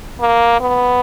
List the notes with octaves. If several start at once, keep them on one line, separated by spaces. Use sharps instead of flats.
A#3
B3